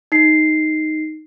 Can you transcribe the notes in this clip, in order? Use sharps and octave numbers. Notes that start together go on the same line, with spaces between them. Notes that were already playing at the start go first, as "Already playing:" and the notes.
D#4 C7